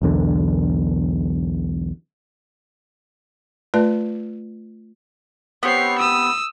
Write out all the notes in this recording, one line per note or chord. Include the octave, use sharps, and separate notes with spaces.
B1 E2 D3
A3 F4 B4 D5 A5
B3 C4 G4 C#5 C7
D#6 E6